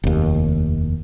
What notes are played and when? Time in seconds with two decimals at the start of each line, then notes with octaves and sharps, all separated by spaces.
0.04 F1 D#2